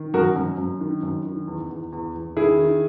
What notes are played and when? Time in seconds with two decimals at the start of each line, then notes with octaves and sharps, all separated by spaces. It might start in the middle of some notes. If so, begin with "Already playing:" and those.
Already playing: D#3
0.14 F#2 F#4 A#4
0.36 F#2
0.58 F#2
0.81 D#3
1.03 F#2
1.25 D#3
1.48 E2
1.70 E2
1.92 E2
2.14 E2
2.37 D#3 E4 G#4
2.59 D#3